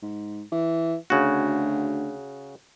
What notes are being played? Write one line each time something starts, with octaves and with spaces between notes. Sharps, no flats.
G#2
E3
D2 C#3 F#4